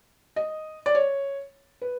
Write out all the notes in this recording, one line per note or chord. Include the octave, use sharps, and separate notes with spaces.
D#5
D5
C#5
B4